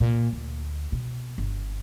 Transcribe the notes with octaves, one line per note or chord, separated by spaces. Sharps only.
A#2
D2
B2
G1